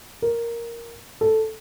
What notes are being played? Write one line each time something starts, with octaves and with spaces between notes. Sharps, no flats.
A#4
A4